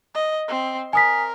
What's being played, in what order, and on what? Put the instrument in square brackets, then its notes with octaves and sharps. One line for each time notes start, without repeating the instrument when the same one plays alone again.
[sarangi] D#5
C4
[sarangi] A#4 [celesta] G#5 D#6 B6